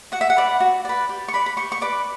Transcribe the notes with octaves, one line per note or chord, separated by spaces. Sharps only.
F#4 F#5
E5
F#5
B4 D5
F#4
B4 D5
G4
C#6
B4 D5 B5
B5
G4 C#6
C#6
B4 D5 D6